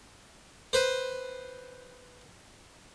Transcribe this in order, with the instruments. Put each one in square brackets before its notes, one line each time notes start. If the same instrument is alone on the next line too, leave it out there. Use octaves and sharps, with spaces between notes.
[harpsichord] B4 C5